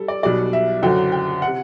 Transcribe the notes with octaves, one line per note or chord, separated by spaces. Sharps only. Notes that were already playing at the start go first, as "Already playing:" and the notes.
Already playing: G3 A4
D5
B1 B2 G3 D5
E5
F#1 F#2 D3 F#3 G5
G5
C3 F#5